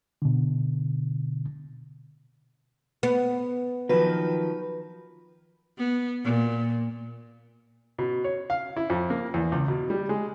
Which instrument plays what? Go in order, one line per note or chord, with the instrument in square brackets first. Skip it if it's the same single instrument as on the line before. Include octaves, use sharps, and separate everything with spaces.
[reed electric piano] B2 D3
[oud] B3
[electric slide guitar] D#3 F3 F#3 [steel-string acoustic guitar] B4
[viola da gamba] B3
A#2
[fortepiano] B2
C#5
F5
E4
F2
A#3
E2
C#2
B2
G3
G#3